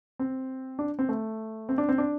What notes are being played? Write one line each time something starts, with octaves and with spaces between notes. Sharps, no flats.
C4
D4
C4
A3
C4
D4
C4
D4